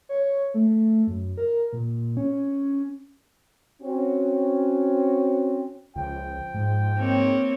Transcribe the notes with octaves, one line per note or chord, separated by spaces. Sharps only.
C#5
A3
F#2
A#4
A#2
C#4
C4 C#4 F#4
C#2 F3 G5
G#2
A#3 C4 C#5